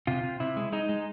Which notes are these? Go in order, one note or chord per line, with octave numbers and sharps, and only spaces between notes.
C3 F4
C3
C3 E4
G#3
G#3 D#4
G#3